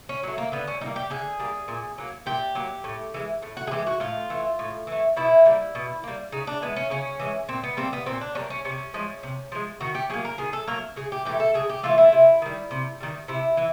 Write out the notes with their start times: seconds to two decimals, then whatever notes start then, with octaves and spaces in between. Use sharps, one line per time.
0.09 C#4
0.23 F#3 A3
0.38 A#3
0.52 D3 B3
0.67 C#4
0.81 G3 A#3 D#4
0.96 G4
1.10 D3 G#4
1.40 G3 A#3
1.68 A#2
1.98 F#3 A#3
2.26 A#2 G4
2.55 F#3 A#3
2.84 A2
3.14 E3 G#3
3.42 A2
3.57 F#4
3.67 G#4
3.71 E3 G#3 G4
3.87 F#4
4.00 A2 F4
4.30 E3 A3
4.59 A2
4.87 E3 A3
5.16 B2 E4
5.45 G3 A#3
5.75 B2
6.04 G3 A#3
6.32 C#3 D#4
6.47 D4
6.62 E3 G#3 B3
6.76 C#4
6.90 C#3 C#4
7.20 E3 G#3
7.48 A#2 C4
7.63 B3
7.77 G3 A#3 C4
7.93 B3
8.06 A#2 C4
8.21 D4
8.35 G3 A#3 C#4
8.50 C#4
8.65 C3 C#4
8.94 F3 G#3
9.23 C3
9.52 F3 G#3
9.80 D#3 F#4
9.95 G4
10.10 F#3 A#3 G#4
10.25 A#4
10.38 D#3 G#4
10.53 A4
10.67 F#3 A#3 A#4
10.96 C#3 G#4
11.12 G4
11.25 E3 A3 G4
11.40 A4
11.54 C#3 G#4
11.69 G4
11.83 E3 A3 F4
11.98 E4
12.12 C3
12.42 D#3 G3
12.71 C3
13.00 D#3 G3
13.28 C3 E4
13.57 E3